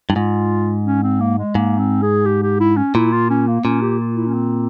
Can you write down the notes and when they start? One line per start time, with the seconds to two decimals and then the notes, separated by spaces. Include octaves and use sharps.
0.10 G2 E4
0.16 G#2 F4
0.85 C#4
1.03 C4
1.20 A#3
1.38 G#3
1.55 G#2 A#3
1.78 C4
2.02 G#4
2.25 G4
2.42 G4
2.60 E4
2.77 C#4
2.95 A#2 E4
3.12 F4
3.30 C#4
3.48 A#3
3.64 A#2 C#4
3.81 G4
4.00 F4
4.16 E4
4.27 C#4
4.34 C4